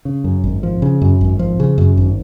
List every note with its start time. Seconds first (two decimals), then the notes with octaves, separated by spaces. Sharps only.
0.05 C#3
0.24 F#2
0.44 G#1
0.63 F3
0.82 C#3
1.02 F#2
1.21 G#1
1.39 F3
1.60 C#3
1.78 F#2
1.97 G#1